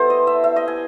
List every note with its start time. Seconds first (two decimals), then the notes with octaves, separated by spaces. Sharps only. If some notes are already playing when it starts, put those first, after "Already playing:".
Already playing: G3 B3 E4 A4 C5
0.10 D#5
0.27 E5
0.44 E5
0.56 D#5
0.68 G#5